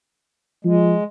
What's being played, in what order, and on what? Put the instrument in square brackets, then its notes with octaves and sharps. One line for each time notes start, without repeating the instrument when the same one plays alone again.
[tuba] F3 [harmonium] G#3